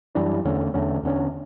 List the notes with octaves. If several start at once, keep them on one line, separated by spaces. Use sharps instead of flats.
F#2 E3 G3 D4
E2 D3 A3 C#4
E2 D3 A3 C#4
E2 D3 A3 C#4